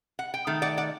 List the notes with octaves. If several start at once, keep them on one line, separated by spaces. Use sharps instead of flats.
F#5
G5
D#3 A3
D5 F#5
D5 F#5